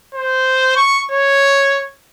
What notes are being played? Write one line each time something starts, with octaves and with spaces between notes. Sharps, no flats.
C5
C#6
C#5